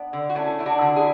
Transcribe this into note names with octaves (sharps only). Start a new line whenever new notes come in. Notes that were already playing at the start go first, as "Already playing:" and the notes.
Already playing: B3 D4
D3
F#4
A3 C#4 E4
A3 E4
D4 F#4
D3
E4 G#4